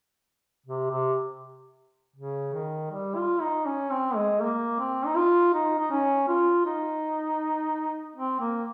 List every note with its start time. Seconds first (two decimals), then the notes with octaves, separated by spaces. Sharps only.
0.66 C3
0.91 C3
2.16 C#3
2.53 D#3
2.91 G3
3.15 F4
3.41 D#4
3.66 C#4
3.91 C4
4.15 G#3
4.41 A#3
4.79 C4
5.06 D#4
5.16 F4
5.54 D#4
5.79 D#4
5.91 C#4
6.28 F4
6.65 D#4
8.16 C4
8.40 A#3